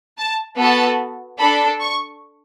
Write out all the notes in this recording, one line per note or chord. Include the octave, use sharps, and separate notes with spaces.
A5
B3 F#4 A4 A5
D4 A4 B5
C#6